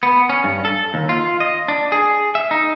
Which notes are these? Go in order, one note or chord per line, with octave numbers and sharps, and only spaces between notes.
B3
C#4
G2
A4
D#2
F4
D#5
D4
G#4
E5
D#4